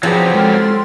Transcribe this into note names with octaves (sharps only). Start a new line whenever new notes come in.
F3 F#3 C4 G4 G#4 B4
G#3 A4 C6 F6